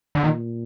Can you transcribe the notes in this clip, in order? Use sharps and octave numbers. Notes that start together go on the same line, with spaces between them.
D3
A#2 D#3